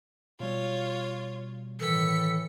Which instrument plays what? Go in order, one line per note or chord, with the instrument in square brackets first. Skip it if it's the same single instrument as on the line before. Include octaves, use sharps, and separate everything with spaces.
[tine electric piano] B2 G3 [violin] F4 C#5
[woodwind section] A2 D#3 E3 [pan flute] A4 [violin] B6 C#7